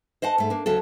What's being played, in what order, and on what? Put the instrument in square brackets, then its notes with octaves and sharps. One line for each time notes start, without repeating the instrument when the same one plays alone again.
[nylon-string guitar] C5 D#5 F#5 A5
G#2 A3
A#3 D4
D2 C#3 F#3 A4